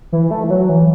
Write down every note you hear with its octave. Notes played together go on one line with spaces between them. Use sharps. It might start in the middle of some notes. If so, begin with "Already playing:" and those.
E3
A3
E3
F#3
E3